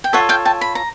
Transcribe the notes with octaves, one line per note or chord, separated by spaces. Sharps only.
G5
F4 A4 C#5 E5 F#5
F5 G5
G5 A5
B5
A#5